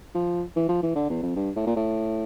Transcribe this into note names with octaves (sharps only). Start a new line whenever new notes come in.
F3
E3
F3
E3
D3
E2
F2
G2
A2
A#2
A2